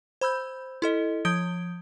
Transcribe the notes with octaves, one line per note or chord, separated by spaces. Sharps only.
C5 B5 E6 G6
E4 A4 D#5
F3 D#6 G6 G#6 D7 G7